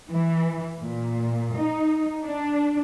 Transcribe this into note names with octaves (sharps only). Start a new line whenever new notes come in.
E3
A#2
D#4
D4